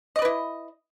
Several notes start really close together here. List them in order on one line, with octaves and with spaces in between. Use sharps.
D#5 D5 B4 E4